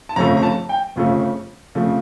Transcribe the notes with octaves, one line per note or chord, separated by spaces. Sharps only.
A5
G1 F2 C#3 F3 A3 A#5
A#5
A5
G5
G1 F2 C#3 F3 A3
F2 C#3 F3 A3